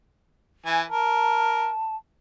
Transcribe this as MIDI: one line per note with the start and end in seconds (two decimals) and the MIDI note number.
0.66 0.82 52
0.66 0.82 80
0.90 1.69 70
0.90 1.96 81